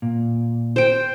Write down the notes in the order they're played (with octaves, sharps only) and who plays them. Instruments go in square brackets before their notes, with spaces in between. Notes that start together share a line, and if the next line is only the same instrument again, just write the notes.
[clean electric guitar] A#2
[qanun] C5 G5